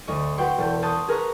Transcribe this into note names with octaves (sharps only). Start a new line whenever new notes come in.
D2 D#5 C#6
F#4 B4 F#5 G5 C6 C#6
E1 A4 G6
A5 C6 C#6 D#6 F#6 G6
G#4 A#4 B4 A#5 C#6 F#6